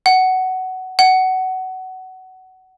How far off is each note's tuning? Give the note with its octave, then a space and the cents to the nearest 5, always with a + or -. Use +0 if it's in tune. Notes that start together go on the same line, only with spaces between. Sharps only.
F#5 +15
F#5 +20